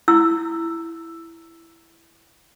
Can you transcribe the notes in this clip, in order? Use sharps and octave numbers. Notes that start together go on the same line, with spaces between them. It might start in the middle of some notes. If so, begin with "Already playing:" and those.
E4 E6